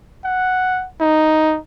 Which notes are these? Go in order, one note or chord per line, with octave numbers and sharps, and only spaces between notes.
F#5
D#4